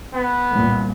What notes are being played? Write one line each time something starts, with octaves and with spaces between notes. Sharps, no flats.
B3
C2 A#2